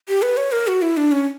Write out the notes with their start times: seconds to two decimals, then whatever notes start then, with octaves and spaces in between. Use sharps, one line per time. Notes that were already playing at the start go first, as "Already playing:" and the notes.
0.09 G4
0.22 B4
0.37 C#5
0.52 A#4
0.67 F#4
0.82 E4
0.97 D4
1.12 C#4